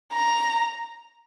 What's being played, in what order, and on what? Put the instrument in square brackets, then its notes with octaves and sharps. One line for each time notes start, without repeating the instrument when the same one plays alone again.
[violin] A#5